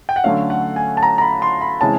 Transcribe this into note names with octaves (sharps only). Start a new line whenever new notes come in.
G5
F#5
D3 F#3 A3 C#4 F5
F#5
G#5
A5
A#5
A#5
B5
C6
B5
C3 E3 G#3 C#4 A5